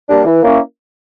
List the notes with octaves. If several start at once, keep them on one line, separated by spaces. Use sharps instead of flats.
G3 A#3 D4
E3
A#3 C#4 E4